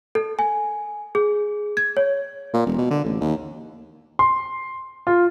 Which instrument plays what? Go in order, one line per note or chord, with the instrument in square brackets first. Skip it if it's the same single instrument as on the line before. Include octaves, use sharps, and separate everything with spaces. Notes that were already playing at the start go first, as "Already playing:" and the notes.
[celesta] A4
G#5
G#4
G#6
C#5
[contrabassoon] A#2
E1
B2
D3
A1
D#2
[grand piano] C6
F4